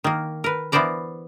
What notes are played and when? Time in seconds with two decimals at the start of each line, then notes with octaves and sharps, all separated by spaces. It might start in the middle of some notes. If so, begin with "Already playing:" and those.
0.04 D#3 A#3
0.44 A#4 B4
0.72 E3 B3 A#4 C5 D5 A#5